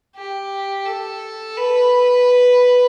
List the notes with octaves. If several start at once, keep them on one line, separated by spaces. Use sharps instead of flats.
G4
A4
B4